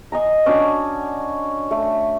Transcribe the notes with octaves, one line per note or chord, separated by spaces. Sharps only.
D#5 G#5 A#5
C#4 D4 F#4
A3